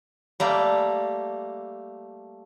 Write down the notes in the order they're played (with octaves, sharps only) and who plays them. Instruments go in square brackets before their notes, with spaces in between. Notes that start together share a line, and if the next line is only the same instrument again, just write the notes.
[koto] G3 A3 A#3